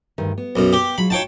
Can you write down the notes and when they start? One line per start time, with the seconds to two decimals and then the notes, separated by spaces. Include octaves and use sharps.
0.18 D2 G2 D#3
0.38 B3
0.56 B1 F#2
0.73 G4
0.98 F#3 G#3 F4 B5
1.10 D#4 F4 C#5 G5 A5